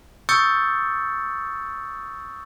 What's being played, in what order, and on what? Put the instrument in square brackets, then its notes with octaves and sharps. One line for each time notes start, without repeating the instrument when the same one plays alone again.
[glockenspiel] C#6 D#6 E6 G6 A6 C#7